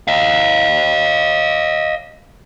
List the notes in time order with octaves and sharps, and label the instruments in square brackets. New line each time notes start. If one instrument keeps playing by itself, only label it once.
[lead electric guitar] D#5 F5